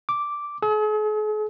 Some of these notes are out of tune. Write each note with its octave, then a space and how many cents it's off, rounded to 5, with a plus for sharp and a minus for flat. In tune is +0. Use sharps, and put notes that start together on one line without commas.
D6 -5
G#4 +45